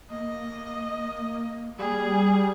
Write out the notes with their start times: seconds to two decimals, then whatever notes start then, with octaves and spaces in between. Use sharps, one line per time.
0.10 A#3 D#5
1.79 G3 G#4